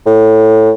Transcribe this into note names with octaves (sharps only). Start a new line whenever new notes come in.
A2